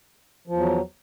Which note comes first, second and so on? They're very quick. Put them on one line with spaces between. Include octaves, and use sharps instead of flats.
F3 E2 F#3